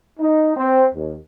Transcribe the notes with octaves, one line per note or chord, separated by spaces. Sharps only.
D#4
C4
D#2